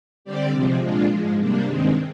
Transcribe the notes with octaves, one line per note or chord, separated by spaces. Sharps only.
D3 G3 C4 G4 D5
C3 F3 G#3 C4
A#2 G#3 D4 F4
G#2 F3 G#3
C3 G3 A#3 D4
G2 D#3 G#3 C4